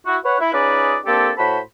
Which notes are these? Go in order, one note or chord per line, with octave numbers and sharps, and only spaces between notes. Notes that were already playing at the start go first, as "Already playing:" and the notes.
E4 F#4
B4 C#5 F#5
E4
C#4 D#4 F4 G#4 B4 D5
A#3 C4 D4 G4 A4
A2 F#4 C5 A5 B5